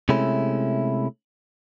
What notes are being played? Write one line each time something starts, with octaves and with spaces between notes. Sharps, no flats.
C3 G#3 A3 C#4 E4